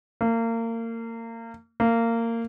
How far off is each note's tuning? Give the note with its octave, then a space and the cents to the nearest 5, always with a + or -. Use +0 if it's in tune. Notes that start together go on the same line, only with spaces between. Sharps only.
A#3 -30
A#3 -20